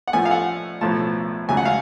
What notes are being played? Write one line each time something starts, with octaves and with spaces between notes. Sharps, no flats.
F#5
A2 F3 A3 F4 G#5
F5
F#5
B1 A2 F3 A3 F4 A5
C#2 C#3 F#3 A3 G#5
F#5
F5